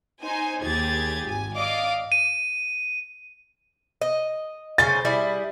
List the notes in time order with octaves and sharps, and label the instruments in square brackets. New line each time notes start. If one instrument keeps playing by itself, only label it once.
[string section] D#4 C5 G#5
D#2 G4 G#4 G#6 A6
G#1 G#5
D5 D#5 F5 D6
[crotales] D#7
[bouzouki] D#5
[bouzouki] C#3 C5 G#5 [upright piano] A6
[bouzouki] G3 E4 G#4